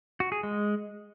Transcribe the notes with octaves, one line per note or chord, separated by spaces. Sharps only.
F#4
G#4
G#3